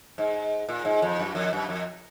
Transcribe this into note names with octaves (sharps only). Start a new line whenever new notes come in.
G#2
A#2
G#2
F2
F#2
F2
F#2
F2